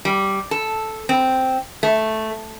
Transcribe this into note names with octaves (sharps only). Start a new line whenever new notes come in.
G3
A4
C4
A3